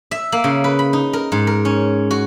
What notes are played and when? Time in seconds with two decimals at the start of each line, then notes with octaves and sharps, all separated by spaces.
0.11 E5
0.32 A#3
0.44 C#3
0.64 B4
0.79 B5
0.93 D#4
1.13 A#4
1.32 G#2
1.47 A#4
1.65 C#4
2.11 F#4